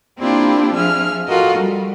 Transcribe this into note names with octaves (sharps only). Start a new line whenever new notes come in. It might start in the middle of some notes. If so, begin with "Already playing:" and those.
A#3 C4 D4 E4 F4 G4
F3 G#4 E5 F6
F4 F#4 A4 A#4 D#5
G3